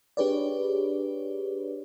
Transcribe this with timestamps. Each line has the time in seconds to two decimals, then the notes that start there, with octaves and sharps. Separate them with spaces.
0.17 D4 G4 G#4 B4 C#5 D5